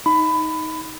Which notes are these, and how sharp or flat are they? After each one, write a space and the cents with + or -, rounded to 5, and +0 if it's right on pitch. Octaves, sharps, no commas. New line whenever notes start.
D#4 +15 B5 +20